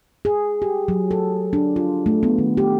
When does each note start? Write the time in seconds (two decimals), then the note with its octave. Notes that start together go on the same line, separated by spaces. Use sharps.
0.25 G#4
0.62 G4
0.88 F#3
1.11 A4
1.53 D4
1.76 F4
2.06 A3
2.23 B3
2.38 D#3
2.57 G4